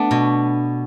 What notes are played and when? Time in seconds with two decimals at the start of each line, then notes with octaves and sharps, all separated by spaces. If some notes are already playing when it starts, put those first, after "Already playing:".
Already playing: A3 B3 D4
0.11 B2